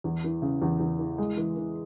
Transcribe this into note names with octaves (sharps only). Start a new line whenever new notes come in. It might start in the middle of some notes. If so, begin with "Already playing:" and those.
E2
E3
C#3
E2
E2
E3
G#3
E3
E3